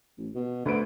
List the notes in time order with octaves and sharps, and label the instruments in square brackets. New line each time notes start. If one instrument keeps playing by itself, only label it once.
[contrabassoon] A1
B2
[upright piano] D2 B4 D7 [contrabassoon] D3